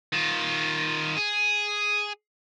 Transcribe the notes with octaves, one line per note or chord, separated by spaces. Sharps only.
D#3 F4
G#4